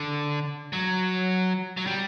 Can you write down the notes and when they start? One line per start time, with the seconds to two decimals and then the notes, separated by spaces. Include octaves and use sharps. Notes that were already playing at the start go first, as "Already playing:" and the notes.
Already playing: D3
0.73 F#3
1.77 F#3
1.87 G3